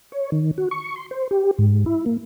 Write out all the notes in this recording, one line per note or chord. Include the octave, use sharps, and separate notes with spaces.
C#5
D#3
F#4
C#6
C6
C5
G4
G#2
E4
A#3